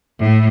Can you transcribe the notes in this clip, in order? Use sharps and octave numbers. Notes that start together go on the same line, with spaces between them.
A2